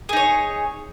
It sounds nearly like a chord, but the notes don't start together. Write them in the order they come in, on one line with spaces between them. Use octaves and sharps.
G#4 D#4 C#5